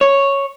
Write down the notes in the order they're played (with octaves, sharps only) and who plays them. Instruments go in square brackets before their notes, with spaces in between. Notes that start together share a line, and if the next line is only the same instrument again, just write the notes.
[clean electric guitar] C#5